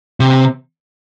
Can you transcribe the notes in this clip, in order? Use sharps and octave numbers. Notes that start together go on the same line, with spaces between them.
C3